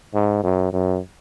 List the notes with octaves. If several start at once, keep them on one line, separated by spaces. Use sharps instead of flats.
G#2
F#2
F#2